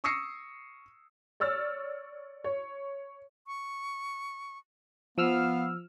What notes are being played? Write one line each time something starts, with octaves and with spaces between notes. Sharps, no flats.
C#6 D#6 E6 A#6 C7 C#7
C#5 D5 E6 F6 A6
C#5
C#6
F3 B3 F5 E6 F6